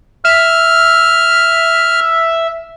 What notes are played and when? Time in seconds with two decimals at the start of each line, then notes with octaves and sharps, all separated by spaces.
0.25 E5 F6